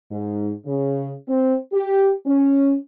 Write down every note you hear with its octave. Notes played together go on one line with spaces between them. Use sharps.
G#2
C#3
C4
G4
C#4